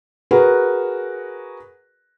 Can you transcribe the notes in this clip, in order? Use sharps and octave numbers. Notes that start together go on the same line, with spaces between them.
F#4 G#4 A#4 B4 F#5